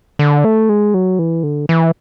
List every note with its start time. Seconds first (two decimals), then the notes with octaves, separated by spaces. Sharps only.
0.19 D3
0.44 A3
0.69 G#3
0.94 F#3
1.19 E3
1.43 D3
1.69 E3